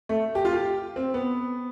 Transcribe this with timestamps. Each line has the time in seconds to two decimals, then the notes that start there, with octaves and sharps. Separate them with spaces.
0.09 A3
0.35 G4
0.45 F4
0.53 G4
0.96 C4
1.14 B3